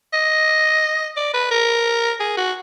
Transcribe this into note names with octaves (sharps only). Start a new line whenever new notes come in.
D#5
D5
B4
A#4
G#4
F#4